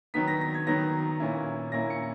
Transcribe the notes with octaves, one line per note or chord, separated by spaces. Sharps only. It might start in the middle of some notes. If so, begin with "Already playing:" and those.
D#3 F#3 B3 D#4 B6
A#6
A#6
G#6
D#3 F#3 B3 D#4 A#6
A#2 A#3 C#4 E4
A#2 A#3 C#4 E4 A#6
C#7